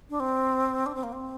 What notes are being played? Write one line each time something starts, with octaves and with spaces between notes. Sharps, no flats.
D4
C4
D4
C4
A#3
C4